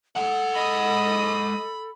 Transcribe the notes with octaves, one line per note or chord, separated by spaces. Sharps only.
G#3 A4 F#5
D#5 B5 D#6